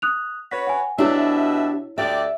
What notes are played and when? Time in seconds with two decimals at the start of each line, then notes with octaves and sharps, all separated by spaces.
0.02 D#6 F#6 F7
0.51 F#4 B4 C#5 B6
0.67 F#5 G#5
0.98 B2 D4 E4 G4 C#5 E5
1.98 D2 G4 D5 E5